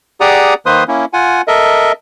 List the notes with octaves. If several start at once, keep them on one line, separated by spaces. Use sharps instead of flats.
G4 G#4 D5 F#5 A#5 D#6
D#3 A#3 B4 C5 C6 D#6
A#3 C#4 E4
F4 F#5 G#5
A4 A#4 D#5 E5